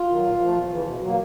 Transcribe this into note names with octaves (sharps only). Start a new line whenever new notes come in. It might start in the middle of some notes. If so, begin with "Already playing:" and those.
Already playing: F4
D#3 F#3
A#2
F3 A3
E2
C#3 E3
B2
F#3 A#3